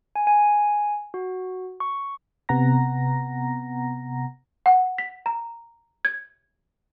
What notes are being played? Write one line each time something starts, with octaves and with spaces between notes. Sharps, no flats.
G#5
G#5
F#4
C#6
C3 B3 F#5 A#5 A#6
F#5
B6
A#5
G#6